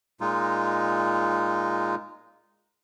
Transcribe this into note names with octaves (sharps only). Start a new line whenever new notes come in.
A#2 G#3 D#4 F4